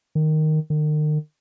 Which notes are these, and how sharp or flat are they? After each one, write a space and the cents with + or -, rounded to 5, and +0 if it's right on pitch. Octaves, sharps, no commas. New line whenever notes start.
D#3 -5
D#3 -40